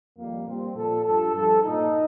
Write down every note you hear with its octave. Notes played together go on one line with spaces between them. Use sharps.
F2 D#3 G3 A#3
A#2 G3 C4
A#2 F3 A4
G2 F3 A4
G2 F3 A4
A#2 F3 D#4